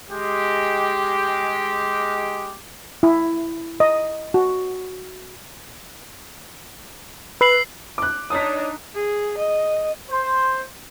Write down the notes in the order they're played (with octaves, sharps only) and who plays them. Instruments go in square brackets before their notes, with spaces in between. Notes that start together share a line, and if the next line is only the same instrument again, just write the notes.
[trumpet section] G#3 G4
[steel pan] E4
D#5
F#4
[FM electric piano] B4 [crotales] E6 C7 F#7
[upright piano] D6 F#6
[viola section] D4 D#4 [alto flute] C#5 [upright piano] D#6 B6
[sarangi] G#4
D#5
[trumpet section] C5